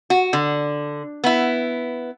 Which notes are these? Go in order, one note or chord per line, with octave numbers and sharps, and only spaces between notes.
F#4
D3
B3 E4